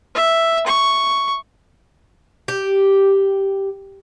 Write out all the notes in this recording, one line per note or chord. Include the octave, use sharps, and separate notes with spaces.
E5
C#6
G4